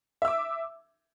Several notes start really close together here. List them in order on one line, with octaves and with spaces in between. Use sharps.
E5 E6 D6